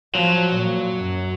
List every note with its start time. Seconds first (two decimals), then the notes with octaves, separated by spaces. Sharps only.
0.15 F3 F#3
0.55 A#2
0.96 F#2